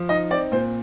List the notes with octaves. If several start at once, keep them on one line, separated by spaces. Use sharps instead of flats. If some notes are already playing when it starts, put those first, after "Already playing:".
Already playing: F3
D#4 D#5
C4 D5
A#2 C5